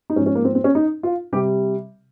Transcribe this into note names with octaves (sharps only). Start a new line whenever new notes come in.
D#4
G#2 F3 C#4
C#4
A#3
C4
C4
C#4
D#4
F4
C3 G3 G4